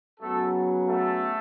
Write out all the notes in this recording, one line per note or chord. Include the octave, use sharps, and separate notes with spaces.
C#3 F#3 A3 B3 A4
A3 A4